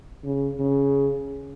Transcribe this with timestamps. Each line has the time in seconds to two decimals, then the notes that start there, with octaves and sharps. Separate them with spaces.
0.24 C#3
0.60 C#3